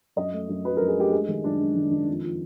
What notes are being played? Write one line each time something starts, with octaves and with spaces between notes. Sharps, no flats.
F#2 D#5
A3
F#2
F#3 B4
A#4
F#2
G#4
A3 G4
G#3 G#4
D#3 G#4
F#2 D4
G#3
D#3
D#3
F2
F3